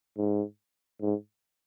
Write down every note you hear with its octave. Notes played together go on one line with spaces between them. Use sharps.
G#2
G#2